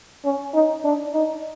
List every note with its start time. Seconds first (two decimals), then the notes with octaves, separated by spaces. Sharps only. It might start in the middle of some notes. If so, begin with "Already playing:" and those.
0.25 C#4
0.54 D#4
0.84 D4
1.13 D#4